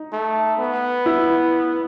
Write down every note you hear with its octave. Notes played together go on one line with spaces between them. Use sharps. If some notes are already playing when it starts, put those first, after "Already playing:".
Already playing: D#4
A3
B3
E4